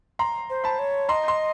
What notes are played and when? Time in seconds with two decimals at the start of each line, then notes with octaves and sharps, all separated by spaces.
0.19 A#5 C6
0.50 C5
0.64 A5 B5
0.79 C#5
1.09 D#5 A#5 C6
1.28 C6